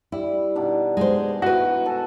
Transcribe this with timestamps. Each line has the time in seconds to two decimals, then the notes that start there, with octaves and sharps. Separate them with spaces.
0.12 G3 E4
0.55 B2 D#3 D4
0.97 G#3 C5
1.42 E4 F#4 B4
1.86 A4 G#5 A5